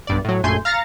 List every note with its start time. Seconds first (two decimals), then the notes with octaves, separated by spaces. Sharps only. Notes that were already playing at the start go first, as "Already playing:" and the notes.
0.07 B1 G2 D5
0.25 A2 F#3
0.44 A#1 F#2 A3 G#5 C6 G6
0.65 F5 A#5 F6 A6 A#6 C#7